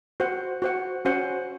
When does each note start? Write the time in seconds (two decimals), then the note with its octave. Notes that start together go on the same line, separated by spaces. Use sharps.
0.20 F#4 C5 F#5
0.62 F#4 C5 F#5
1.05 C#4 F#4 C5 F#5